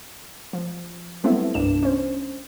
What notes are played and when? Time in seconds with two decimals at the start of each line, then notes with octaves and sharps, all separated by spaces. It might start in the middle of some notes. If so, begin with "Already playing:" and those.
0.53 F3
1.24 F#3 G3 A3 B3 C4 E4
1.54 C2 G2 D4 E7
1.83 C#4 C5